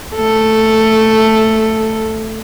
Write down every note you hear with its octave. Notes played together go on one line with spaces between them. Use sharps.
A3 A4